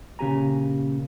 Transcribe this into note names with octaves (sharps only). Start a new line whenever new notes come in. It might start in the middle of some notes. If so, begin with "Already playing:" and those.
A#2 C#3 F4 G4 G#5 A#5